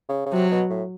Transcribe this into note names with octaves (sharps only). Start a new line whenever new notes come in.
C#3
C#3
C3 F#3
B2
A2